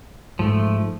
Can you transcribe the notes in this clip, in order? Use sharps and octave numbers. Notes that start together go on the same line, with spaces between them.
G#2 F3 A3